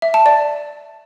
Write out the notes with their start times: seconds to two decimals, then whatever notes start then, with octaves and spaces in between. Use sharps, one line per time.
0.02 E5
0.14 A5
0.26 D5